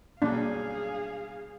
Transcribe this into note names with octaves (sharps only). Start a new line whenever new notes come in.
B1 G2 A#3 D4 G#4 F5